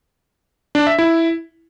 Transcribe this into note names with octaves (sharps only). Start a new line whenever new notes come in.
D4
E5
E4